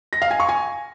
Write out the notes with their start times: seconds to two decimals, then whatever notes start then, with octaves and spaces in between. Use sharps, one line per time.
0.13 A#6
0.22 F5
0.31 G#5
0.40 C#6
0.49 G#5